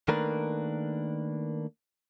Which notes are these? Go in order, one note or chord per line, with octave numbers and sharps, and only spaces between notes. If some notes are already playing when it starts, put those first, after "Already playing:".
D#3 A3 A#3 D4 A#4 B4